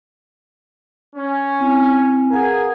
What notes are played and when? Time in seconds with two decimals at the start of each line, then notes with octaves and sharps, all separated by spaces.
1.16 C#4
1.60 C4 E4 G#5
2.31 G#4 A#4 B4 F5 F#5 G#5